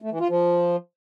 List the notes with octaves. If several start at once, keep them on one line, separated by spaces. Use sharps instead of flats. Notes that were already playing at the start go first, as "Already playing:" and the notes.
A3
E3
F4
F3